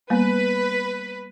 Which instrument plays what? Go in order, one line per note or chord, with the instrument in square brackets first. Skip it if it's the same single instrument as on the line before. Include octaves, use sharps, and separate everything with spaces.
[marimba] G3 A#3 B3 [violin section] B4